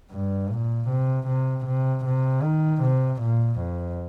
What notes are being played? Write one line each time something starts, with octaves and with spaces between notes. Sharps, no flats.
G2
A#2
C3
C3
C3
C3
D#3
C3
A#2
F2